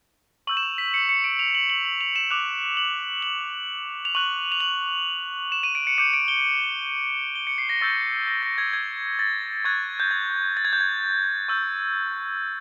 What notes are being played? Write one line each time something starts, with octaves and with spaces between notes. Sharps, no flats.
C#6 E6 G6 F#7
E7
F7
B6
C#7
C#7
D7
F7
F#7
F#7
F#7
F7
E7
D6 F#6 F7
F#7
F#7
F7
C#6 F#6 F#7
F7
F#7
E7
D#7
D7
C#7
D6 G6 C#7
D7
G7
G7
C#7
C7
A#6
C#6 E6 G6 A6
A#6
A#6
G#6
G#6
A6
C#6 F#6 G#6
G6
G#6
A6
G#6
G6
G#6
C#6 E6 G6